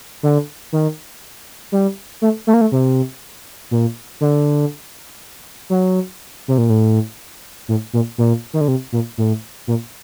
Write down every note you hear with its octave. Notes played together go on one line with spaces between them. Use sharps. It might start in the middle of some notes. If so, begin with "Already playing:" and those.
D3
D#3
G3
A3
A3
A#3
A3
C3
A#2
D3
F#3
C3
A#2
A2
A2
A#2
A#2
D#3
D3
C3
A#2
A2
A#2